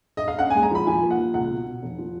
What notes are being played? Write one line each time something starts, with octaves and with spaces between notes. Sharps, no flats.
D#5
F5
C#4 F#5
G#5
G#3
A#5
F3 B5
F3 G#5
A#3
F#5
F3
C#2 F#5
B2
B2
F1
F3